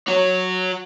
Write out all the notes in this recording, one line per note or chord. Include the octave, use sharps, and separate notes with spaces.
F#4 C#5